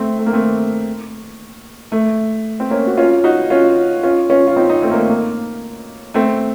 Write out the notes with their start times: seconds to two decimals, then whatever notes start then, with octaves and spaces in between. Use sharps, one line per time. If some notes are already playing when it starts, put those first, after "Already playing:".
Already playing: A3 C4
0.18 A3
0.26 A#3
0.33 A3 C4
1.92 A3
2.60 C4
2.71 A#3 C#4
2.87 F#4
2.97 C#4 F4
3.24 D#4 F#4
3.50 C#4 F4
4.03 C#4 F4
4.30 C#4 F4
4.47 F4
4.56 C4 D#4
4.69 C4 D#4
4.82 A3 C4
4.91 A#3
4.96 A3
5.09 A#3
6.14 A3 C4